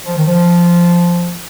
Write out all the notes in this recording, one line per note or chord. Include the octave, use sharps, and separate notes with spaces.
F3
D#3
F3